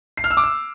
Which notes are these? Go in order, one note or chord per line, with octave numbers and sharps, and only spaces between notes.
C7
F6
E6
D6
E6